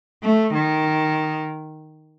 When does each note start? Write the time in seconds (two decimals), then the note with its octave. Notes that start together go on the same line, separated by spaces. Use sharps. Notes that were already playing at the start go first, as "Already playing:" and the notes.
0.23 A3
0.54 D#3